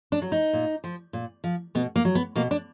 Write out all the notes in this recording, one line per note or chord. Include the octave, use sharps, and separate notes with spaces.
D4
F#3
D#4
A#2
F3
A#2
F3
B2 B3
A#3
F#3
B3
B2 A#3
D4